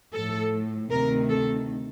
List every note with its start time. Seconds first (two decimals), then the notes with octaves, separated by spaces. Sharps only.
0.13 A2 F3 A4
0.91 D2 C3 D#3 A#4
1.29 A4